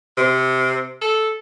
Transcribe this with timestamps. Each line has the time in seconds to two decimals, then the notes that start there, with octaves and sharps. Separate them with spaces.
0.17 C3
1.01 A4